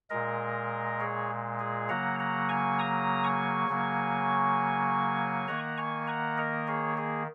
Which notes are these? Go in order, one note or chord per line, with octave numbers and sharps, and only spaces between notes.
A#2 G#3 A#4 D#5
G#4 C#5
G#4
C#3 F#3 A#3 F#5 A#5
F#5 A#5
G#5 C#6
A#5 D#6
G#5 C#6
C#3 F#3 A#3
D#3 A#3 F#5 A#5
G#5 C#6
F#5 A#5
A#4 D#5
G#4 C#5
G#4